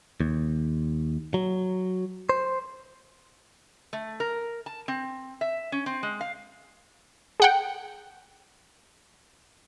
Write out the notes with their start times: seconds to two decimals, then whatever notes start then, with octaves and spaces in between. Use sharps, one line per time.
0.21 D#2
1.34 F#3
2.29 C5
3.93 A3
4.20 A#4
4.66 A5
4.88 C4
5.41 E5
5.72 C#4
5.86 C4
6.03 G#3
6.21 F5
7.40 G#4 F#5 G5